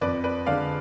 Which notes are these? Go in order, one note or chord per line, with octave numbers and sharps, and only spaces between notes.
F2 B4 D5
B4 D5
D3 G#3 D5 F5